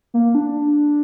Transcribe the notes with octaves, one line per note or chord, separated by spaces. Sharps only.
A#3
D4